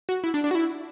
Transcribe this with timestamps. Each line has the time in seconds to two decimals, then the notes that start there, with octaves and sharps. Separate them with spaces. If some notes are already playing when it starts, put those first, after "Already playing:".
0.09 F#4
0.24 E4
0.34 D4
0.44 D4
0.51 F#4
0.55 E4